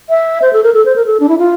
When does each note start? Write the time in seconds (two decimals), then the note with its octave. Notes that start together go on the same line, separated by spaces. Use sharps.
0.09 E5
0.42 C5
0.53 A4
0.63 A#4
0.74 A4
0.86 C5
0.96 A#4
1.06 A4
1.20 D4
1.29 E4
1.39 F4